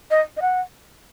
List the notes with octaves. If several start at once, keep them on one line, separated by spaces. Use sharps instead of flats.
D#5
D#5
F#5